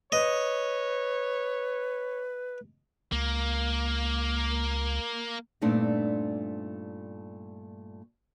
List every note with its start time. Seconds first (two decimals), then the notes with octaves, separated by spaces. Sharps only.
0.12 B4 C#5 D#5
3.12 C#2 A#3
5.61 G2 A#2 A3 C4 D4 D#4